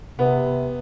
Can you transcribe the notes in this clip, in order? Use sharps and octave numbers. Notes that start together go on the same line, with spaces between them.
C3 B3